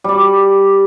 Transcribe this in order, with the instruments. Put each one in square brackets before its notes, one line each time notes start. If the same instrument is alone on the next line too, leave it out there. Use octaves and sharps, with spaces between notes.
[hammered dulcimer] G3 D5